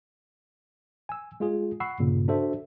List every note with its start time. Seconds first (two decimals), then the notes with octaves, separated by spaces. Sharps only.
1.09 G#5 E6
1.40 G#3 F4 G#4
1.80 F#5 B5 C#6 E6 C7
1.99 G2 A#2 C#3
2.28 D4 F#4 A4 C5 E5